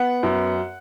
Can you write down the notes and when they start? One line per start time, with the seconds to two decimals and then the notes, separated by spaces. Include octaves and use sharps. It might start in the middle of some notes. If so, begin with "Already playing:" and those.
Already playing: B3 F#5
0.23 F#2